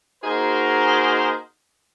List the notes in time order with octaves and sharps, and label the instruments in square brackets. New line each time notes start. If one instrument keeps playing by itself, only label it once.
[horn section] A#3 D#4 F#4 G#4 A#4 C5